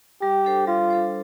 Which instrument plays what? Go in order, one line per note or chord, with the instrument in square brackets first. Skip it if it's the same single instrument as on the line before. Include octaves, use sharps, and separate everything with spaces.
[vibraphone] G3 [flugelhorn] G4
[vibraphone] D4 A4 C5
[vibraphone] G3 [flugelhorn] F4
[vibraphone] D4 A4 C5